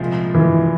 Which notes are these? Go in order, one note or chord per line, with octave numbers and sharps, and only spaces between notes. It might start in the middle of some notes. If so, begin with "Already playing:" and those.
Already playing: C2 A#2 F3 G#3 C4
E3